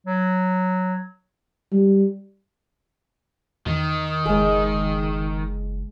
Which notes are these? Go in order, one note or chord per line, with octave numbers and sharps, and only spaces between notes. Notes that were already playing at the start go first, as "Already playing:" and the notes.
F#3
G3
E2 D#3
F#1 G#3 G#4